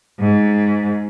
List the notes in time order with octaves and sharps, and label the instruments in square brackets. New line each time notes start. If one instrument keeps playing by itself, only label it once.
[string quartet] G#2